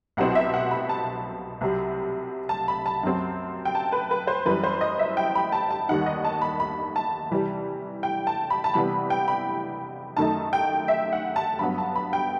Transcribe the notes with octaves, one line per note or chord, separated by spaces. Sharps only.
C2 B2 F#3 C4 E4 F#5
E5
F#5
B5
A5
C2 C3 F#3
A5
B5
A5
F#2 F#3 C4
G5
A5
B4
B4
C5
F#2 E3 G3 B4
C5
D#5
E5
G5
B5
A5
A5
D#2 D#3 G3 D#4 F#5
D#5
A5
B5
B5
A5
C3 E3 G3
G5
A5
B5
A5
C3 E3 G3 B3 B5
G5
B5
F#2 D#3 A3 D#4 A5
G5
E5
F#5
A5
G2 F#3 B3 B5
A5
B5
G5